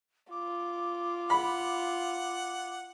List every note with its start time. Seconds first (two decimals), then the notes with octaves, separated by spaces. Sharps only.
0.32 F4 D6
1.30 F#5 B5